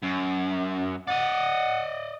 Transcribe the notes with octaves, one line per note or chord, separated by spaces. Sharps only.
F#2
D5 D#5 F#5